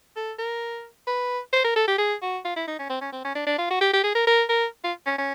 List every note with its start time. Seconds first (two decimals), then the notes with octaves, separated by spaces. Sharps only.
0.16 A4
0.39 A#4
1.07 B4
1.53 C5
1.64 A#4
1.76 A4
1.88 G4
1.98 G#4
2.22 F#4
2.45 F4
2.56 E4
2.68 D#4
2.79 C#4
2.90 C4
3.01 C#4
3.12 C4
3.25 C#4
3.35 D4
3.47 D4
3.58 F4
3.70 F#4
3.81 G4
3.93 G4
4.04 G#4
4.15 A#4
4.27 A#4
4.49 A#4
4.84 F4
5.06 C#4
5.18 C#4